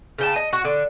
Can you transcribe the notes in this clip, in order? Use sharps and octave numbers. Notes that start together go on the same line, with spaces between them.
C#3 G5 A5
D#5
F#4
D3